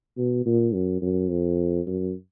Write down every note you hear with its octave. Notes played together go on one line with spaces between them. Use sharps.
B2
A#2
F#2
F#2
F2
F#2